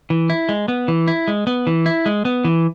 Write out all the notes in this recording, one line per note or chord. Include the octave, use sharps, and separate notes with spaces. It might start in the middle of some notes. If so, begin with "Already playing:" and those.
E3
E4
G#3
B3
E3
E4
G#3
B3
E3
E4
G#3
B3
E3